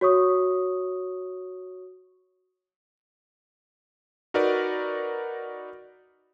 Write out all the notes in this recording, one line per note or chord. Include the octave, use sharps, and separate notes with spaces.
F#4 C#5 C#6 D#6
D#4 F#4 A#4 B4 D5